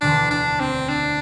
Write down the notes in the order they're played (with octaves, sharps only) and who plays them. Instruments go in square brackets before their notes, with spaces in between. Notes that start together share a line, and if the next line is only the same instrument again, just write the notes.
[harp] E1 D2 D3 [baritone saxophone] D4
[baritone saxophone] D4
C4
D4